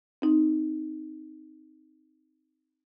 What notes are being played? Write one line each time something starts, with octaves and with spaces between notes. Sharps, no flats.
C4 D#4